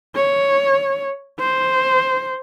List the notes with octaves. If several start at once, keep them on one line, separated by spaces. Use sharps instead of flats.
C#5
C5